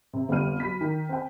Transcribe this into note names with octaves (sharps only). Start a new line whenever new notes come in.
C3
G1 F2 G3 F6 D#7
F#3 F#4 B5 B6
D#3
C4 G5